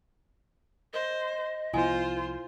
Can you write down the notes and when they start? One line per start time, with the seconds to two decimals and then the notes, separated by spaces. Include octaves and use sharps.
0.93 C5 D#5
1.73 C2 F3 B3 E4 F4 C5 G#5